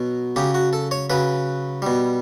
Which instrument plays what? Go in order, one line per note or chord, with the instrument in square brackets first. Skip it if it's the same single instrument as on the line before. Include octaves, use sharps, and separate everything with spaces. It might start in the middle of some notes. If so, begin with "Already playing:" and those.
Already playing: [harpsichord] B2 F#3
C#3 F#3 G4
F#4
A4
C#5
C#3 F#3 B4
B2 G3